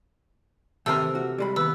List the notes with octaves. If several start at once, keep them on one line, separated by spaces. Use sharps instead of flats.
D#2 C3 E3 A3 C4 A#4 E6
F#4
G3 G#3 B5
D#3 A#3 B3 B4 E6